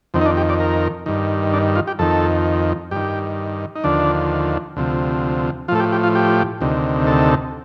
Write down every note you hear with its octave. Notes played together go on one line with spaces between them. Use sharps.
F2 D#3 C4
D#4
D4
G4
D5
A#4
G2 D#3
D4
F4
G4
F2 D#3 A4
G2 D#3 G4
D#4
D#2 D3 F3 D4
D2 C3 F3
A2 F3 F4 A4
G4
G4
F4
G4
D2 C3 D#3
A4